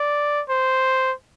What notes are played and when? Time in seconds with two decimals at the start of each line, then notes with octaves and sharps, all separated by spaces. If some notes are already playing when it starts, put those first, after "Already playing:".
Already playing: D5
0.49 C5